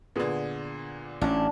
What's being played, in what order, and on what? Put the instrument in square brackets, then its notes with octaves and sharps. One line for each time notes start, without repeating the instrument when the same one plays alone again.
[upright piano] A#2 D3 [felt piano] B3 G#4
[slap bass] A1 C#4 [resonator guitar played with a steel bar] D4